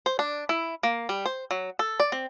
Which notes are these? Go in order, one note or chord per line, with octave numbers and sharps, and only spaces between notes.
C5
D4
E4
A#3
G3
C5
F#3
A4
D5
C4